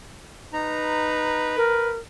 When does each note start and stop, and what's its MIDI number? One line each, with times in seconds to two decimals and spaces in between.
0.53 1.56 63
0.53 1.95 71
0.53 1.56 82
1.56 1.98 70